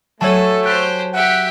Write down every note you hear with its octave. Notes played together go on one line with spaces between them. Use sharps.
F#3 A3 A4 C#5 G#5 A5
G4 C5 F#6
G4 E5 F#5